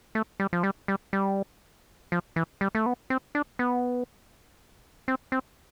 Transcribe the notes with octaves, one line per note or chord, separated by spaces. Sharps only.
A3
G3
F3
G3
G3
G3
F3
E3
G3
A3
B3
C4
D4
B3
C4
C4